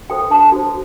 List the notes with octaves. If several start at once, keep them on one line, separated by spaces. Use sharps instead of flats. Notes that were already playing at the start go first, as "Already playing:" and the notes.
F#4 A4 C5 G5
D4 A5
F#4 A4 C5